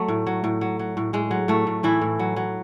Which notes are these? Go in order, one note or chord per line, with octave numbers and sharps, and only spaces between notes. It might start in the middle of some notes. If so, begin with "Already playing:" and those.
Already playing: F#3 A3
A2
F#3
A2
F#3
F#3
A2
A2 G#3
F#3
A2 A3
A2
A2 E3 E4
A2
F#3
F#3